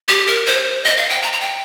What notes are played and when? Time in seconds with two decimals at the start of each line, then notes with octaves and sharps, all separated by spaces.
0.08 G4
0.27 A#4
0.46 C5
0.84 D#5
0.97 F5
1.09 G5
1.22 A#5
1.33 A#5
1.41 G5